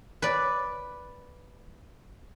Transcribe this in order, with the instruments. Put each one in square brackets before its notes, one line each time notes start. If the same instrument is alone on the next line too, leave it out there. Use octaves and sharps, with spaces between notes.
[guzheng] B4 D5